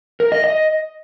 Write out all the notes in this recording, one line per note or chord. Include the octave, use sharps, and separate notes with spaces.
A#4
D#5
D#5